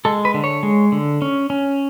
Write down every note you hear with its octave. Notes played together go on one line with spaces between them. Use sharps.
G#3 A4
B4
D3
C#5
G#3
D3
C#4
C#4